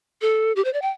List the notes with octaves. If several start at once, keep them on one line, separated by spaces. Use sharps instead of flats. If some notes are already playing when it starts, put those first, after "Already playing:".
A4
G4
C5
D5
G5